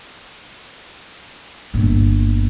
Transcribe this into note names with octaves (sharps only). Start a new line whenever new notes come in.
G1 A#2